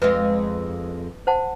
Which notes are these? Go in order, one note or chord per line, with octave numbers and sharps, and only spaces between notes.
F2 G#3 F4 B4
C5 F#5 A5